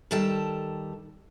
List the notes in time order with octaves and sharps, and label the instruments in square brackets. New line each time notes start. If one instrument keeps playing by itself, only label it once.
[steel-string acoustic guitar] D#3 G3 A4 G5 A5